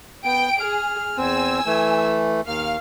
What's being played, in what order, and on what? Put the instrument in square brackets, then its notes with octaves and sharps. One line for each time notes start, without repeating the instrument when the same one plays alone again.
[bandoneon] B3 [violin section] G5 D7
[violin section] G#4 [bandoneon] F6
[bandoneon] E2 C4 [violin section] G#5 E6
[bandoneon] E3 A3
[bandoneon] D#2 [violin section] F5 F6